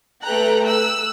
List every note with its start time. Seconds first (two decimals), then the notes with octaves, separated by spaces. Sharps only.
0.24 A3 A4 B4 G5 A#5 F#6
0.64 E6 F#6